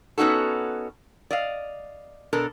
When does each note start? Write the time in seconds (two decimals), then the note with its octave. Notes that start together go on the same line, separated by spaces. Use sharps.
0.18 B3 C#4 D#4 F#4 A4
1.31 D5 D#5 F5
2.33 B2 D4 A4 A#4